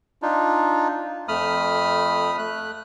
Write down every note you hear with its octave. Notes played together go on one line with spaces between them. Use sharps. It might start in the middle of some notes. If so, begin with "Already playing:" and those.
D4 D#4 F4
F2 A3 B5 D#6 F6
A3 F#6